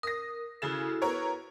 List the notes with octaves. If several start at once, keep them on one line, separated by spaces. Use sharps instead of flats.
A#4 D#6 A#6
C#3 E4 F#4 G#4 A4 E7
B3 A#4 C#5